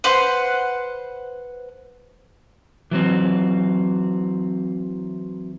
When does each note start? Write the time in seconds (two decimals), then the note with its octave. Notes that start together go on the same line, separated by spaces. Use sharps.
0.04 B4 C5 F#5
2.91 E3 F#3 C4